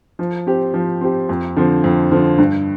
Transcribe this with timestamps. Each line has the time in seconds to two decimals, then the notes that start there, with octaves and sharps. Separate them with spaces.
0.19 F3
0.46 C4 G4
0.74 F3
1.01 C4 G4
1.29 F2
1.56 D3 F3 C4
1.84 F2
2.11 D3 F3 C4
2.38 G2